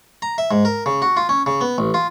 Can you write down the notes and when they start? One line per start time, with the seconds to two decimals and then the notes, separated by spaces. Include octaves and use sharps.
0.22 A#5
0.38 E5
0.51 G#2
0.65 A#4
0.86 C#3
1.02 F#4
1.17 F4
1.29 C#4
1.46 C#3
1.61 B3
1.78 A1
1.94 F4